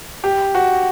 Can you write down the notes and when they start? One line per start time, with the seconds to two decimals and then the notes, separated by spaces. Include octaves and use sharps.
0.24 G4
0.55 F#4